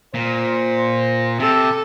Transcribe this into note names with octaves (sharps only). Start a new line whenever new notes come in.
A#2 C5
C3 A4